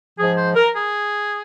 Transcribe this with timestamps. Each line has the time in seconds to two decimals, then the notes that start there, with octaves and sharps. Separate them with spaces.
0.19 G#2 F3 G#4
0.37 C5
0.56 A#4
0.76 G#4